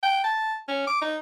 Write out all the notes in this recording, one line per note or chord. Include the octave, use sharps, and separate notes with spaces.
G5
A5
C#4
D6
D#4